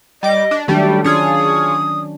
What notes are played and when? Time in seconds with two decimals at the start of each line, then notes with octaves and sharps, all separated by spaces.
0.23 G3 D#5 D6
0.51 D4
0.68 D#3 F#3 G3 A3 D4 G4
1.04 C#4 D4 F4 G#4 C#5 D#6